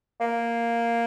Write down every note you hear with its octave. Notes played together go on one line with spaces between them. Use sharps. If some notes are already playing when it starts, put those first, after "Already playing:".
A#3